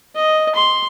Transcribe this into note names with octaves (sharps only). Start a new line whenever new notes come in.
D#5
C6